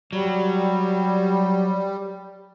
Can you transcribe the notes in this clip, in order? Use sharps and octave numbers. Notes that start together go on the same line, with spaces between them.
F#3 G3